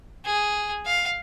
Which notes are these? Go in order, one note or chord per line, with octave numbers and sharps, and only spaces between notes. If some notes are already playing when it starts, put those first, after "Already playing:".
G#4
F5